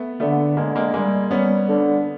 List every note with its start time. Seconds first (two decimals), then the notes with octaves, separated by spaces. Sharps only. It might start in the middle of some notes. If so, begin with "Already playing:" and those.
Already playing: A3 B3
0.20 D3 A3 B3
0.57 D3 G#3 A#3
0.76 G#3 A#3
0.94 G3 G#3 A#3
1.31 G3 B3 C#4
1.68 D3